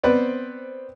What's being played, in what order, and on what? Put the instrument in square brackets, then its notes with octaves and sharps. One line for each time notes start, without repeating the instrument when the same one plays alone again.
[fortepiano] B3 C4 B4 C5 D5